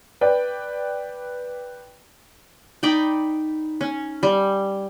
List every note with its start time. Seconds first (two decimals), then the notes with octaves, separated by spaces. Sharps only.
0.21 B4 D5 G5
2.83 D#4 D5 G5 B5
3.81 C#4
4.23 G3